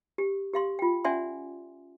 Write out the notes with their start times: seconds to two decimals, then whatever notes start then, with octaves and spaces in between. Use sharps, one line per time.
0.18 G4
0.54 G4 F5 C6
0.79 F4 G5
1.05 C#4 D5 E5 F#5 G#5 C6